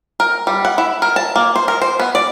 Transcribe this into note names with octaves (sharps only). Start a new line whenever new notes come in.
A#4
G3
F#5
E4
A#4
A5
A#3
C5
A#4
C5
B3
D5